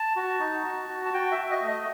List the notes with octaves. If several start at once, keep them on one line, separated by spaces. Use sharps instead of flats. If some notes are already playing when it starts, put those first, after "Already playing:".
Already playing: A5
F#4
D#4
F#4
F#4
A5
F#4 G5
E5
F#4
D#5
A3
D#5